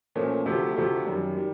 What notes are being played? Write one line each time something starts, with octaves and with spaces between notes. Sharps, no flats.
A#2 F3 A3 C#4
D2 C3 F3 A3
D2 C3 F3 A3
F#2 D#3 G3
D#3 G3